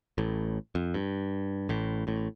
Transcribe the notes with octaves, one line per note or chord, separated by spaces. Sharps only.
A1 A2
F2
G2
A1 A2
A1 A2